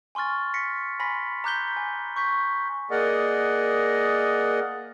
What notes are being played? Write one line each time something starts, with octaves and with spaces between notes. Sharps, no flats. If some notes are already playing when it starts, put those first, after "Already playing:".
G#5 C6 C#6 F6 A6
A#6 B6 C#7
G#5 B5 C6 A#6 B6
A#5 D6 F#6 G6 B6 G7
G#5
C#6 G6 B6
A#3 G#4 A#4 D5 D#5 F#5